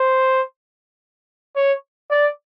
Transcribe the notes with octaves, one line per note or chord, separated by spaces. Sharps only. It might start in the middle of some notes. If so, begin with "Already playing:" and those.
Already playing: C5
C#5
D5